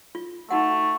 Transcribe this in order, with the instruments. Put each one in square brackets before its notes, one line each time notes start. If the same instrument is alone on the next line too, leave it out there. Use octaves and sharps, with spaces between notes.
[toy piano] F4
[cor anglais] A3 [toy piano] D#4 F#4 F#5